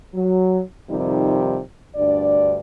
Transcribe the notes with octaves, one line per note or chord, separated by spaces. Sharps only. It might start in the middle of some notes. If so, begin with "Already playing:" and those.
F#3
F2 C3 D#3 F3 G3 D#4
D2 G2 D4 D5